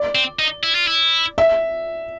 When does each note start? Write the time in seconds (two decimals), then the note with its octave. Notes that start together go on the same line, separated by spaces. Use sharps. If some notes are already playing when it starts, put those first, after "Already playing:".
Already playing: D5
0.15 C4
0.39 D#4
0.64 E4
0.75 F4
0.88 E4
1.38 E5